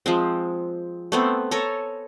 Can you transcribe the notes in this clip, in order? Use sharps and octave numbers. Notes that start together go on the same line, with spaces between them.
F3 G#3 C4
A3 B3 C4
A4 C#5 G#5 A#5